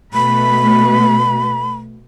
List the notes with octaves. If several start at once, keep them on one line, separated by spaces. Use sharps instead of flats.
B2 A3 B4 B5